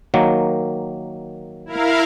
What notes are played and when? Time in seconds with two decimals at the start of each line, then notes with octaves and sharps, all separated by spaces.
0.14 D#3 F#3 A#3
1.65 E4 A#4 F5